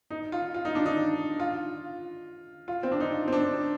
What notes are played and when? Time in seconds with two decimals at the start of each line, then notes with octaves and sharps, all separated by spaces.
0.11 D#4
0.32 F4
0.54 F4
0.65 D#4
0.75 D4
0.86 D#4
1.40 F4
2.68 F4
2.83 C4
2.92 D4
3.00 D#4
3.28 C4
3.32 D4